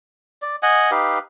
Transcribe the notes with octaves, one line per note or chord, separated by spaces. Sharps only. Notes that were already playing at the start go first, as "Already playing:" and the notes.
D5
D#5 F#5 G#5
D#4 G4 B4 F5